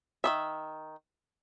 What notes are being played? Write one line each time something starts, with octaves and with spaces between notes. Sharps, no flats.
D#3 D#4 E5